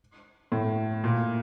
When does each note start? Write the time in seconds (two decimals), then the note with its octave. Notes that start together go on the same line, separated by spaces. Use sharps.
0.52 A2
1.04 A#2